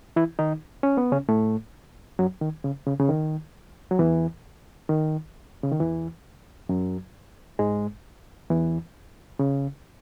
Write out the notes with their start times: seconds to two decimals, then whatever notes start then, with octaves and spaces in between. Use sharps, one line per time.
0.16 E3 E4
0.39 D#3 D#4
0.83 C#4
0.97 B3
1.12 C#3 C#4
1.29 A2 A3
2.19 F#2 F#3
2.41 D#3
2.64 C#3
2.86 C#3
3.00 C#3
3.09 D#3
3.91 F#3
3.99 E2 E3
4.89 D#3
5.63 C#3
5.71 D#3
5.80 E2 E3
6.69 F#2 F#3
7.59 G#2 G#3
8.50 E2 E3
9.39 C#3